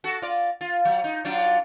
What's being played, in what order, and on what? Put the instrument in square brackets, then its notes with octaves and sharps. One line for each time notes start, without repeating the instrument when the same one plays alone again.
[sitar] F#4 A4
F4 D5
F4
F#3
D#4
F#3 D4 F4